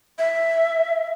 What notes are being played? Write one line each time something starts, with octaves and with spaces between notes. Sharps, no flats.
E5